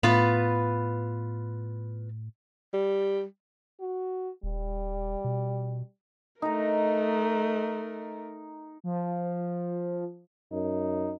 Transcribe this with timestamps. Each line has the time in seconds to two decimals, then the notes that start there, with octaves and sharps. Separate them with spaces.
0.03 A2 B3 F4 B4
2.73 G3
3.80 F#4
4.43 D#1 G3
5.24 B2
6.42 A3 D#4 A#4 A#5
8.84 F3
10.52 F#2 D#4